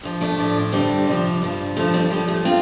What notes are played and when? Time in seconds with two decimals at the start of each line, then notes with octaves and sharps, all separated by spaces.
0.03 G2 F3
0.21 A3 D4
0.38 A2 F3
0.72 G2 D3 F3 G3 C4
1.07 F2 C3 F3
1.42 G2 F3
1.76 G2 D3 F3 A3
1.93 G3 C4
2.10 A2 F3 G3
2.28 A3
2.45 D3 C4 F4